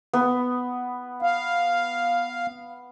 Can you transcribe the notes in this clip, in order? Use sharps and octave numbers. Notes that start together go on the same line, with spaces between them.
B3
F5